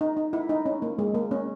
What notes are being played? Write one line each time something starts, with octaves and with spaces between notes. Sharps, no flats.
D#4
D#4
E4
D#4
C#4
A#3
G#3
A#3
C#4